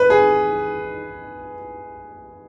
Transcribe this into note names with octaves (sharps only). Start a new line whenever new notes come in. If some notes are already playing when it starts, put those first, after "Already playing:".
Already playing: B4
G#4